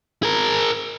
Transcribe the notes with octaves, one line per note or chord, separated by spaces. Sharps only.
G#4 A#4